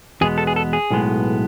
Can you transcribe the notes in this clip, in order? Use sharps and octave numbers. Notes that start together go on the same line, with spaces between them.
E2 B2 G#3 B3 G#4
A4
G#4
A4
G#4
B1 A2 G#3 B3